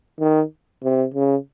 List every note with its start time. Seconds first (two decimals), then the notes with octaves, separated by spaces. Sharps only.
0.20 D#3
0.83 C3
1.14 C#3